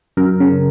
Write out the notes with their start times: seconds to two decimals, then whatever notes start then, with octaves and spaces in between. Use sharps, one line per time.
0.17 F#2 A#4
0.40 C#3